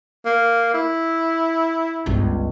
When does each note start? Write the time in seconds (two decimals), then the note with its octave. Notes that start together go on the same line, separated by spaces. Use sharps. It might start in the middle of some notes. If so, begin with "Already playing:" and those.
0.26 A#3
0.74 E4
2.06 G1 C#2